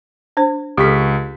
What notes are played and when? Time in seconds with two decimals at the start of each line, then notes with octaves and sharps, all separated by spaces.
0.37 D4 C5
0.78 C#2 G4 A4 C#6 B6